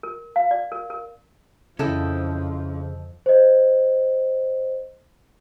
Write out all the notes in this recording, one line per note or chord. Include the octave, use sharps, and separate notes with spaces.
A#4
F5
D5
A#4
A#4
F2 C#3 F3 C#4 E4 A4 D#5 G5
C5 D#5